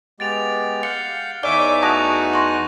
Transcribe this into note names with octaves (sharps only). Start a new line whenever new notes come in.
G#3 B3 G4 A6 D7 F7
F5 F#5 G6 C#7
E2 D#4 C#5 D5 E5 G#5 D6 G7
A3 F#4 A5 C#6 D#6 F#6 A#6 F7
C6 C#6 A#6